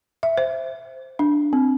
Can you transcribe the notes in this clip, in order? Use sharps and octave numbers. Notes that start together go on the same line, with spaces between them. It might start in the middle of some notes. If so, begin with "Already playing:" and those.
E5
C5
D4
C4